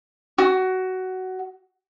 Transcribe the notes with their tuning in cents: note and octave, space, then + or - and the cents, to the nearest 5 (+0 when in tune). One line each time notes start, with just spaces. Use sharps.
F#4 +15